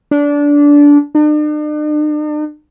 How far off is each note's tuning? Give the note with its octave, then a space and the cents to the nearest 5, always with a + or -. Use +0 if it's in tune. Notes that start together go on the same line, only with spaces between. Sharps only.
D4 -20
D4 +45